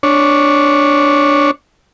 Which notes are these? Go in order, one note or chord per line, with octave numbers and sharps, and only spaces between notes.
D4 C#5